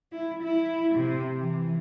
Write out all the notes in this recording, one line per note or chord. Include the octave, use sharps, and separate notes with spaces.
E4
E4
C3
E3